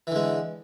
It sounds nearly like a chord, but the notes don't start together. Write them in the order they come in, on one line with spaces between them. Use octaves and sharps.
E3 D3 G#3